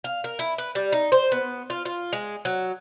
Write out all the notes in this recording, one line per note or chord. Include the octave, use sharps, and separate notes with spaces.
F5
A#4
E4
B4
G3
D#4
C5
B3
F4
F4
G#3
F#3